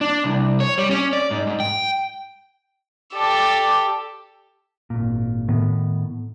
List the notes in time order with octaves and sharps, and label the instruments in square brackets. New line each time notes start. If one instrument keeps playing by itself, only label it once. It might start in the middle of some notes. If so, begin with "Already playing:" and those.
[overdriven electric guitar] D4
C2
C#5
G3
C#4
D5
G#2
G#2
G5
[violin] G4 A4 [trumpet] D5
[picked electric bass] G#1 A#2
A2 D#3 B3